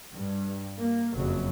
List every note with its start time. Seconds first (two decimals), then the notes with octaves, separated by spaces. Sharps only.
0.14 G2
0.80 A#3
1.16 F#1 F2 F#3